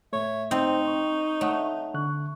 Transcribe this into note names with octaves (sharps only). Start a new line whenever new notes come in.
A2 A3 C#5 E5
C4 D#4 C5
C#6
A3 C#5 F#5 D#6
D3 C#6 F#6